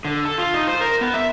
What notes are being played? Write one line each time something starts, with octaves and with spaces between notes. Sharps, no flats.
D3
A4
F4
D#4
C5
A#4
B3
E5